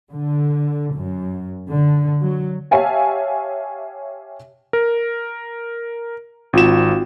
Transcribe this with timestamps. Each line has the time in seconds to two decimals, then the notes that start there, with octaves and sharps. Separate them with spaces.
0.12 D3
0.96 F#2
1.68 D3
2.21 F#3
2.71 G4 C#5 E5 F5 G#5 A5
4.73 A#4
6.53 G#1 C4 F4 F#4 E7